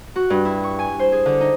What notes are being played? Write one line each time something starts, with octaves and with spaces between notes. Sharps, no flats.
F#4
G2
E4
C#6
G#5
C5
G#4
D3
D#4